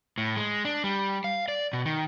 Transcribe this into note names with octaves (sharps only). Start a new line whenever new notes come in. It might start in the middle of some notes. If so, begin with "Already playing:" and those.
A2
G#3
D4
G3
F5
D5
B2
D#3